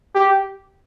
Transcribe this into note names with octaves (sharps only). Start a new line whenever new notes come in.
G4